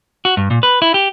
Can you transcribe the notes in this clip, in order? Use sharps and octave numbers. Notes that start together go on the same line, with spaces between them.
F#4
G2
A#2
B4
E4
G4